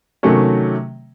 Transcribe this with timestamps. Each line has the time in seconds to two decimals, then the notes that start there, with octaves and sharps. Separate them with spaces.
0.23 C3 D#3 F#3 A3 C#4